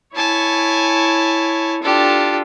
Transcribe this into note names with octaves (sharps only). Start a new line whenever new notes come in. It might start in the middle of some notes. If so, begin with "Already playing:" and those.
E4 C#5 G#5 A5
D4 F4 G4 A4